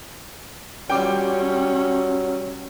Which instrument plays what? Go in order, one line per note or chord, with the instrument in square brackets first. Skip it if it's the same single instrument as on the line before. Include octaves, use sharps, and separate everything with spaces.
[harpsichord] A1 G3 F4 [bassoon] F#3 [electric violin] C#4 [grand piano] G5 D6